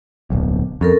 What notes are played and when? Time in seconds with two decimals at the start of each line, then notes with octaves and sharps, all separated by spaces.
0.30 D1 B1
0.81 F2 C#4 A4 A#4